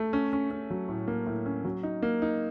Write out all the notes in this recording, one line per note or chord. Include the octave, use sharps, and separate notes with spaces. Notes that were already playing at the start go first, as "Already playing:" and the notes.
Already playing: A3
C#4
C#4
C#4
F#3
A2
A#3
A2
C#4
F#3
D#4
A#3
D#4